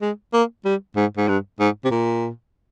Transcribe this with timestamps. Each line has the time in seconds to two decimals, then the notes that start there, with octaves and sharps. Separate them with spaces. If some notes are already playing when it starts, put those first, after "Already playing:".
0.02 G#3
0.33 A#3
0.65 G3
0.96 G#2
1.17 G#2
1.28 G2
1.60 G#2
1.85 C3
1.91 A#2